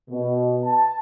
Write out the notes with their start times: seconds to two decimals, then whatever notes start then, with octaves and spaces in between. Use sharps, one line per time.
0.10 B2
0.65 A5